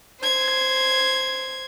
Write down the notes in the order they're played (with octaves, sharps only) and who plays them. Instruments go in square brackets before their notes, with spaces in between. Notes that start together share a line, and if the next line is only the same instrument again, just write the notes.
[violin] C5 G#6